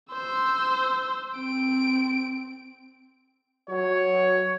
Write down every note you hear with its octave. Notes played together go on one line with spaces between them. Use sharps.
C5 E6
C4 D7
F#3 C#5